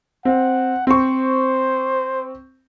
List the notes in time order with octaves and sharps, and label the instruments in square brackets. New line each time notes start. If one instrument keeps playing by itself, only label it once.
[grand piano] C4 [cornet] F#5
[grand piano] C4 C#6 [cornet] C5